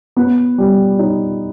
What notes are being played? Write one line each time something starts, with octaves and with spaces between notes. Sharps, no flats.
B3
G3
D#4